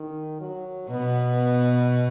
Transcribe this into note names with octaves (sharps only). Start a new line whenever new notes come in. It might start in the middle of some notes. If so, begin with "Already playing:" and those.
Already playing: D#3
F#3
B2 B3